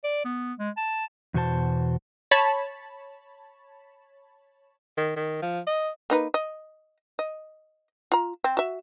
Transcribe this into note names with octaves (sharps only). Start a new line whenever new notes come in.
D5
B3
G#3
A5
E2 B2 F#4 C5 A5
C#5 A5 B5
D#3
D#3
F3
D#5
A#3 D#4 B4
D#5
D#5
F4 A#5
C4
F#4 E5